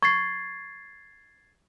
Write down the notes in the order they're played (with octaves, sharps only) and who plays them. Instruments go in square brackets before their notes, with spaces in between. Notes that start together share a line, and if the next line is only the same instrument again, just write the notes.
[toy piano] C#6 [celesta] G#6 A6 C7